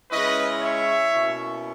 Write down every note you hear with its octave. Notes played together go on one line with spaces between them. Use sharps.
C#3 G#3 C#4 E4 B4 D#5
C#5 E5
B2 A#3 C#4 E4